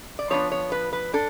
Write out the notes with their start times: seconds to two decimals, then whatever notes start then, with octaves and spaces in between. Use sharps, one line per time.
0.19 D5
0.30 F3 B3 D4 C#5
0.52 C#5
0.72 B4
0.93 B4
1.14 D4 A4